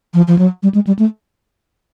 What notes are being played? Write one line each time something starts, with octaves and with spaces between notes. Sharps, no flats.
F3
F3
F#3
G3
G#3
G3
A3